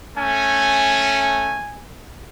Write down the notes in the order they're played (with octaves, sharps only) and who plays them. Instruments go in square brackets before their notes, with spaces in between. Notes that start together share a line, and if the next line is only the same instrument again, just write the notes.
[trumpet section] A3 C#4 [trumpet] G#5